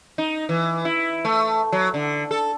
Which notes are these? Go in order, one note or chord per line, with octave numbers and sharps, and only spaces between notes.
D#4
E3
E4
A3
F#3
D3
A4